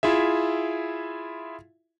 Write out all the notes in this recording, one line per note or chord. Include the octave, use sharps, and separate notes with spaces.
E4 F4 G#4 E5